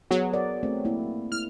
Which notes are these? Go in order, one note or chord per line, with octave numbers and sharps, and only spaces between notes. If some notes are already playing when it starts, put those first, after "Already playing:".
F#3 B3 G#4
A#4 D5
A3 C4
A#3 E4
E4 F6